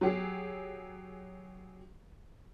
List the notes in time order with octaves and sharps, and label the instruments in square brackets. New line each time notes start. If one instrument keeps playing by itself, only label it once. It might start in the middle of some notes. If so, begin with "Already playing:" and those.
[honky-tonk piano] F#3 G4 G#4